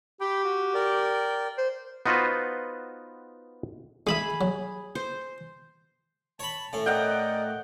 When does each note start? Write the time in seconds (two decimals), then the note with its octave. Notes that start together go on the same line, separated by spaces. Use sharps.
0.21 G4 G5 B5
0.44 F#4
0.74 A#4 D5 G5
1.58 C5
2.06 B3 D#4 F4 F#4 B4 C5
4.07 G#3 E4 G#4 B5
4.41 F#3
4.95 C5
6.40 C#5 A5 B5
6.73 A2 C#4
6.86 A#4 D5 D#5 F#5 G5